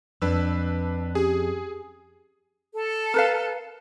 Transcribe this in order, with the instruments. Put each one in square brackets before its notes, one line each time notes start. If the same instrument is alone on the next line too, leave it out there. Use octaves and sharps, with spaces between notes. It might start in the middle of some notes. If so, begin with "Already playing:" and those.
[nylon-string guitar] F2 [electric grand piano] D4 B4 E6
[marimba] C#4 G4 [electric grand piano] G#4
[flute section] A4
[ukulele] A#4 B4 F5